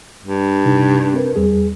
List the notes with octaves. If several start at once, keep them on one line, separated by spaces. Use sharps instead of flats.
G2
C3 D#4
C4 A#4 B4
E2 G3 G#4